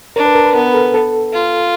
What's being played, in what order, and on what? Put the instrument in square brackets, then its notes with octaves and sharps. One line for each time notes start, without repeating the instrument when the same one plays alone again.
[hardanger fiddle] D4 [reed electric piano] A#4
[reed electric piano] B4
A#4
B4
[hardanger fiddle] B3 [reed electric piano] A#4
[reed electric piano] A4
A4
[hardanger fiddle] F4